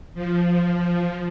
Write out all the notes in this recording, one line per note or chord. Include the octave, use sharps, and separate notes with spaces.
F3